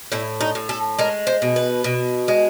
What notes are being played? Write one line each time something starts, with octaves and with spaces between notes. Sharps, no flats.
A2 E4
D#4
A2
A4
G#3 A#4
C5
B2
B4
B2
G#3